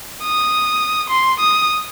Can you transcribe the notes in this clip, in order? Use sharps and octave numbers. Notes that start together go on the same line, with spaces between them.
D#6
C6
D#6